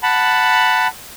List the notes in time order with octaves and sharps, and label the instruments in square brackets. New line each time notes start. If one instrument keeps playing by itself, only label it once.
[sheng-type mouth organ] F#5 A5 B5